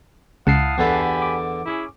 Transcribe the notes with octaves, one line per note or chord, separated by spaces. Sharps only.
C#2 E4 F5 F#5 A5 D#6 C7
E2 D3 G4 A4 G#5 B5
D6
C#4 E4 G#4